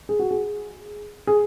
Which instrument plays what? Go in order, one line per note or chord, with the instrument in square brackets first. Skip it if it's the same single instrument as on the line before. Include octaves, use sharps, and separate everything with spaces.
[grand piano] G#4
F#4
G#4
G#4